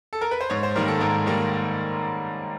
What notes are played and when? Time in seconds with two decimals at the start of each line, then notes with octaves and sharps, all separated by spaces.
0.13 A4
0.21 A#4
0.31 B4
0.41 C5
0.50 G#2 C#5
0.63 C5
0.75 D#3 G3 A#3 A#4
0.88 A4
1.00 G#2 A#4
1.26 D#3 G3 A#3